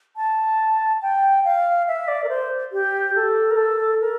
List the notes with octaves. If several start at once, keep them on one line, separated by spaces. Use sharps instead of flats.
A5
G5
F5
E5
D5
A#4
C5
G4
A4
A#4
A4
A#4